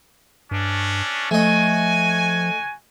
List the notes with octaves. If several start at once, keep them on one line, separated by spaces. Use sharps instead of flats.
G2 A3 C#4 D4
F3 A3 F#4 D#5 G#5